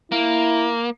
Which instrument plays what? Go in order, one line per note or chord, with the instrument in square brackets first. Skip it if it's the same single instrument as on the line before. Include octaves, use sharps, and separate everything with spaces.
[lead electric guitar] A#3 [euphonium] E4